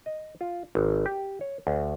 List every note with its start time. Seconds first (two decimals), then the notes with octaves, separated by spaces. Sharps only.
0.06 D#5
0.41 F4
0.75 G#1
1.06 G4
1.41 C#5
1.67 D2